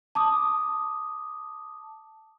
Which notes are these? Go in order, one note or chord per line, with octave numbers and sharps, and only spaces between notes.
A5 D6 D#6